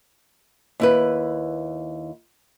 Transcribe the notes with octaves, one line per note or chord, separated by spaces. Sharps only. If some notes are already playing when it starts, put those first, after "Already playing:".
D#2 E4 B4